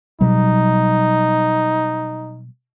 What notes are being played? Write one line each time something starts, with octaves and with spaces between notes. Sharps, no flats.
B2 F#3 G3 D#4